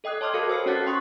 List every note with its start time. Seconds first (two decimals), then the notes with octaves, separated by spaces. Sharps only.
0.04 A4 D#5 G5 D#6 F#6
0.21 C#5 A5 C6 D6 F6 G#6
0.34 F#4 A4 A#4 F5 G#6 C#7
0.49 C5 A5 E6 F6 C7 C#7
0.66 C#4 F#4 C#5 F#5 F#6 A6
0.86 G5 C6 C#6 D#6 F#6